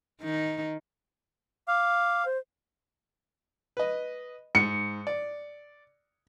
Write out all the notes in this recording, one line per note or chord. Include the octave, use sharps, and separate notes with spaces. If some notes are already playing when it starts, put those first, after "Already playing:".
D#3 D#4
F5 D6
C5
B4 D#5
G#2 C#7
D5